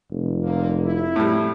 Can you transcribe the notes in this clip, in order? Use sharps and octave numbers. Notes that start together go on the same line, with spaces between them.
F1
D3 F3 A#3
E4
A2 G3